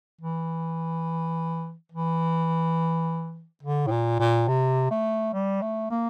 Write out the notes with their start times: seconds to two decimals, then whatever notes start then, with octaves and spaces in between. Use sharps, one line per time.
0.21 E3
1.92 E3
3.63 D3
3.87 A2
3.91 A#2
4.19 A#2
4.48 C3
4.91 A3
5.34 G3
5.62 A3
5.91 A#3